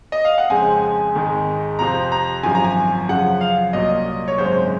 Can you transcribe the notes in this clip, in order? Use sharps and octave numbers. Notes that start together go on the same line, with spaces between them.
D#5
F5
F#5
F2 C#3 G#3 C4 G#5
G#1 G#2 D#3 G#3
F2 C3 F3 C4 A#5
A#5
G#1 F#2 F3 G#5
A#5
G#5
F#2 C#3 F3 F#5
F5
C2 A#2 F#3 D#5
C#5
G#1 F#2 C#3 G#3 C5